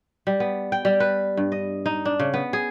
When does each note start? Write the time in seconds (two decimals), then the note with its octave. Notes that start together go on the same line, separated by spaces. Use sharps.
0.27 G3
0.40 B3
0.72 G5
0.85 G3
1.00 B4
1.37 G2
1.52 D#5
1.86 D#4
2.05 D4
2.19 C#3
2.34 B3
2.53 G#4